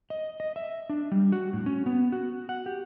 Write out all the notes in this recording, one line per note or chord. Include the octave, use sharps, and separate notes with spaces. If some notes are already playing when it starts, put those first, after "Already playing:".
D#5
D#5
E5
D4
G3
F#4
A2
C#4
B3
F#4
F#5
G4